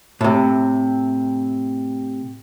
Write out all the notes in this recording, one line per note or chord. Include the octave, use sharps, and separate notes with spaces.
A2 C3